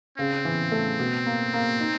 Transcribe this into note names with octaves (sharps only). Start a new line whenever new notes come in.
C#3 C4
E3
A3
B2
A#3
A#3
D#4